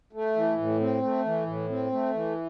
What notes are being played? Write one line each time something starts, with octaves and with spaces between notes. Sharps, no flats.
A3
E3
A2
C4
A3
E3
A2
C4
A3
E3